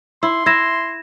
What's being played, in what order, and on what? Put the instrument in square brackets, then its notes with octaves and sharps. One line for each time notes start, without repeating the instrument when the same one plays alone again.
[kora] E4 [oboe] C6
[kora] E4 [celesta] G#6 A#6 E7